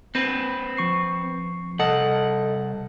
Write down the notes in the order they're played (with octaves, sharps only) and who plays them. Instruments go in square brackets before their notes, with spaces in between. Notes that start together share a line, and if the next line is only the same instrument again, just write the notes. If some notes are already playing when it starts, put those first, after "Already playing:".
[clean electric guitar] C4 B4
[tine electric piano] F3 C#6 C7
[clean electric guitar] C2 F#5 [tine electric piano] A4 D#5 A5